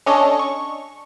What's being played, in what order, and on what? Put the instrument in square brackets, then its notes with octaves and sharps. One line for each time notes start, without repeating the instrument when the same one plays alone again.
[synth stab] C#4 D4 A4 C#5 D#5
C#6